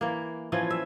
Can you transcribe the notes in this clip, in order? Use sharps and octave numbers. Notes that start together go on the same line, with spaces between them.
E3 A#3
E3 F3 C#4
E5